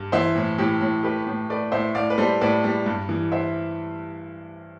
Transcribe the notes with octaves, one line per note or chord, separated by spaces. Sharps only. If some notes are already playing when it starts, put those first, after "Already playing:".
Already playing: G2
E3 C5 E5
A2
A2 G4
A2
A3 G4 B4
A2
A3 B4 D5
A2 C5 E5
A2 D5 F5
B4
G3 A4 C5
A2 B4 D5
G3
G2
E3
C5 E5